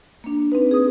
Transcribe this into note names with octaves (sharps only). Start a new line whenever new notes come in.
A#3 D4
C4 D#4 B4
G#4 D#6